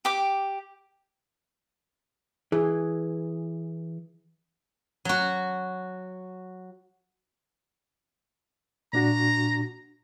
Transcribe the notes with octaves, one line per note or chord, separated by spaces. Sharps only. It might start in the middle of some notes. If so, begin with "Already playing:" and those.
G4 G5 D6
E3 G#4
F#3 F#4
A#2 D4 F#4 A#5